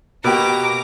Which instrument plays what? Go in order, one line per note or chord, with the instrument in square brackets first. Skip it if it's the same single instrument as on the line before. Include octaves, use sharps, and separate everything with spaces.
[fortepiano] B2 A#3 G4 [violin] A#5 D6